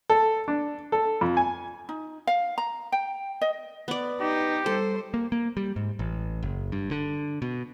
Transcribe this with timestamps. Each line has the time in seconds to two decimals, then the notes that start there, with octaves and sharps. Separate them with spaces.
0.10 A4
0.48 D4
0.92 A4
1.21 F2
1.37 G#5
1.89 D#4
2.27 F5
2.58 A#5
2.92 G5
3.41 D#5
3.88 B3 B4 D5
4.21 D#4 G4
4.66 G3 A4 C5
5.14 A#3
5.32 A#3
5.57 G3
5.76 G#2
5.99 A1
6.43 F#1
6.72 G2
6.91 D3
7.42 B2